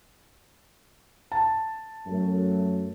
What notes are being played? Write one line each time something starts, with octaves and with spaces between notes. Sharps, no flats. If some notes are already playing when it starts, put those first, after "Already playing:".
A5
F#2 A3